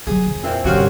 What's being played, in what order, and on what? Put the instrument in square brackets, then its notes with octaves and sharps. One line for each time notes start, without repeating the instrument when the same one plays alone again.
[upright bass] F#3 [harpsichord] G#4
[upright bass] F2
[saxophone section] A#2 E3 C4
[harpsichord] C2 F5 [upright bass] G2 D3 [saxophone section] C4 C#4 F#4